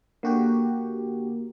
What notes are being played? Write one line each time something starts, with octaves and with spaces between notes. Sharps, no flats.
D3 A#3 F#4 G4